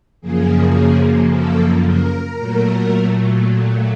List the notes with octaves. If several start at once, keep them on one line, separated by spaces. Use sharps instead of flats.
F#2 C#3 F3 A#3 G#4
A4
A#4
A#2 F#3 A3